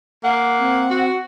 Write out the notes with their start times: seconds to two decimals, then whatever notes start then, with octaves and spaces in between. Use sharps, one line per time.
0.24 A#3 F#5
0.59 C4
0.91 F#4